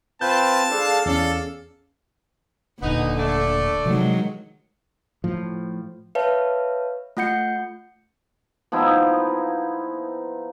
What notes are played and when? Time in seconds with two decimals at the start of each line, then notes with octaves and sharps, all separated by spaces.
0.21 C4 F4 B4 A5 G6
0.70 D4 G#4 A4 F5
1.06 E2 C#4 A4 D5
2.82 D#1 A#2 D3 B3 D#4
3.18 A3 D5
3.85 C3 D#3 F3 F#3 G#3
5.24 A2 F3
6.15 B4 C#5 E5 F5 A5
7.17 A3 F4 F#5 G6 C#7
8.72 F3 B3 D#4 E4